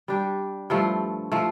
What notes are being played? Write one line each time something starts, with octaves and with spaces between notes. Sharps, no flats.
G3 D4 G4
G2 F3 A3
F3 A3